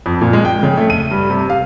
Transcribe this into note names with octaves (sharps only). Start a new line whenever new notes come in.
F2
A#2
G#3
G5
C#3
A3
D#7
G2
C3
F5